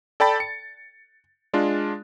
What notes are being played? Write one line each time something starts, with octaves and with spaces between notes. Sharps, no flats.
A4 D5 G5 A5 B5 A6
C#7
G#3 D4 F4